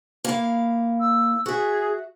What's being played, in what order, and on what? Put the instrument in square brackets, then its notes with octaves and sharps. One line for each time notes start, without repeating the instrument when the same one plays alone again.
[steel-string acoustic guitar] A#3 E4 F5
[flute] E6
[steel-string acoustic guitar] F#4 E5 [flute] G#4